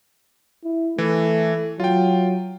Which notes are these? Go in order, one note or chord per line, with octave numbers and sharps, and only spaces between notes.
E4
E3 A3
F#3 F4 G5